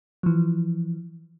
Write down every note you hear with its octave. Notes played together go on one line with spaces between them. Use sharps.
E3 F3